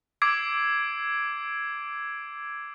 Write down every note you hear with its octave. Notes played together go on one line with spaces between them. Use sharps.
D6 E6 G#6 C7 D7